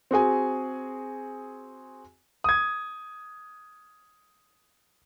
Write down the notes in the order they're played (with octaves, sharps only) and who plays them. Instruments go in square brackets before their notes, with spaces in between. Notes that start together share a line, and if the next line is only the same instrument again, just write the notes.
[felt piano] C4 F#4 G#4 G#5
[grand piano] D#6 G#6